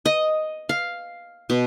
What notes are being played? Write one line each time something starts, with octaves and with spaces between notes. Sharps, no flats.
D#5
F5
B2